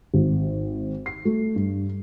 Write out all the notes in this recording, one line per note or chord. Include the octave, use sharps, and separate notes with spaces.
G#1
C7
A3
G2